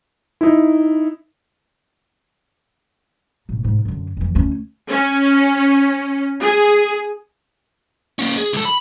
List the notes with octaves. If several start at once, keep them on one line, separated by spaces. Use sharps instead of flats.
D#4 E4
A1 B2
G#2
F#2 D3
F2 E3
D2 C#4
C#4
G#4
A#3 C#4
G#4
C#2 A4
B5